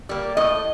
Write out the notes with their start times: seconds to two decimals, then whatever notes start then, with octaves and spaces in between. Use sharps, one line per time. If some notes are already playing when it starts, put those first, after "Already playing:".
0.09 G3 A#3
0.37 A2 D#5